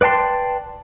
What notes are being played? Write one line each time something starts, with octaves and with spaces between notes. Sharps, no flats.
B4 D5 G5 A5 C6